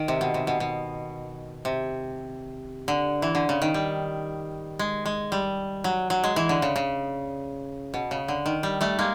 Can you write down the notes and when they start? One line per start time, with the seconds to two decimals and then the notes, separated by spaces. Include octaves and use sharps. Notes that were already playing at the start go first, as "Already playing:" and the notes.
Already playing: D#3
0.08 C3
0.21 B2
0.34 C3
0.47 B2
0.60 B2
1.65 C3
2.88 D3
3.22 E3
3.35 D3
3.49 C#3
3.62 D#3
3.74 G3
4.79 G#3
5.06 G#3
5.32 G3
5.84 F#3
6.10 F#3
6.24 G#3
6.36 E3
6.49 D3
6.62 C#3
6.76 C#3
7.94 B2
8.11 C#3
8.28 D3
8.46 D#3
8.63 G3
8.81 G3 A3
8.99 G#3 A#3